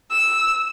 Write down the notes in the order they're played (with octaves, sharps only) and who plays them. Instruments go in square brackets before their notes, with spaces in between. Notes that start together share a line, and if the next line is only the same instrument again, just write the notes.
[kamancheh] E6